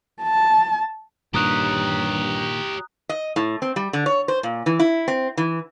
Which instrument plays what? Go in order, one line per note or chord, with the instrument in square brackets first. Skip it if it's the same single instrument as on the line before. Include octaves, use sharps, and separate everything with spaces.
[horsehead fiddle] A5
[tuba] G2 [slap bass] A#2 D#3 [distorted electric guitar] G4 C#5 [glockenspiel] A#5 D#6 F#6
[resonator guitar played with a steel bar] D#5
A2
C4
G3
D3
C#5
C5
A#2
E3
E4
C4
E3